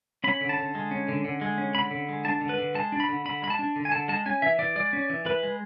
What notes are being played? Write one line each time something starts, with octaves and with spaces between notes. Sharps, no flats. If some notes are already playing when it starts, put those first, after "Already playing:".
C#4 B5
D3
A5
D3
G#3
C#4
D3
D3
G#3
C#4
D3 B5
D3
G#3
D4 A5
D3
B4
D3
G#3 A5
D4
B5
D3
D3 B5
G#3 B5
A5
D4
D3
G#5
D3 A5
G#3 A5
C#4 G#5
E3 E5
E3 D5
G#3 D5
C#4
E3
E3 B4
G#3